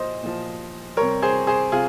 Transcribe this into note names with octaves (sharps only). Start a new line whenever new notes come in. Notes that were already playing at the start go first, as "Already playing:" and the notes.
Already playing: A#2 F3 C5 D#5
A#2 F3
C3 G3 A#4 C#5
G#4 C5
G#4 C5
C3 F4 G#4